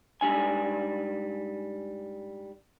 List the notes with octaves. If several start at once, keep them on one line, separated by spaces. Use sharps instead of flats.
G#2 G3 D4 G#5